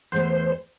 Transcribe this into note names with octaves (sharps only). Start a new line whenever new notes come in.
E2 E3 A3 C5